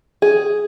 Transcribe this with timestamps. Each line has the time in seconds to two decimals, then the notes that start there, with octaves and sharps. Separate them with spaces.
0.22 G#4